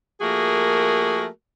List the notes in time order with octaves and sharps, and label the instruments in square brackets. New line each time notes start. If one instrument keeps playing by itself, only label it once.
[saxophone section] F3 A3 A#3 F#4 G#4 A#4